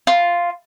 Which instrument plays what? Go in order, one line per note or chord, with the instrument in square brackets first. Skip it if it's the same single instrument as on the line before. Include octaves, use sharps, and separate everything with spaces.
[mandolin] F4